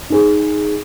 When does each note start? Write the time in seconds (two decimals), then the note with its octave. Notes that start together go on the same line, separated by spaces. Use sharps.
0.10 D#4 G#4